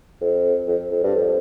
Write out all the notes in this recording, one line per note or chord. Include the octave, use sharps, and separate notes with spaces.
F2
F2
F2
G2
F2